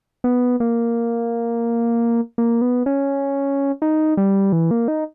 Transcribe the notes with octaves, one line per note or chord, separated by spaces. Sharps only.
B3
A#3
A#3
B3
C#4
D#4
G3
E3
A#3
D#4